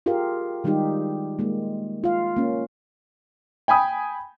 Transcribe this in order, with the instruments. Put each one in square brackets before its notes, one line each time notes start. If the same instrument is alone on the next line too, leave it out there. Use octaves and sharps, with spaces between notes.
[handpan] F4 G4 G#4 A#4 F5
D#3 G3 G#3 D#4 G4
G#3 A#3
F4 F5
A#3 C#4
[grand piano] G5 G#5 B5 D#6